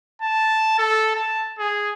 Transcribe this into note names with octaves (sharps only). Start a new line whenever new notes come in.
A5
A4
A5
G#4